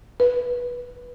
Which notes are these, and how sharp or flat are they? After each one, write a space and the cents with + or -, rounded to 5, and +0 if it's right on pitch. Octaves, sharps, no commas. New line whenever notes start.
B4 -10